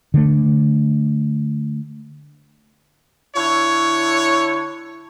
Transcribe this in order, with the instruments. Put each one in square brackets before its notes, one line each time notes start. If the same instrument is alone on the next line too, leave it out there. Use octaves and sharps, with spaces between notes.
[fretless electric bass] D3 A3
[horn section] D3 E4 C#5